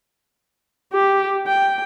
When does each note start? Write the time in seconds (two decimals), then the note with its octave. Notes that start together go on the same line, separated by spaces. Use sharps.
0.93 G4
1.46 G5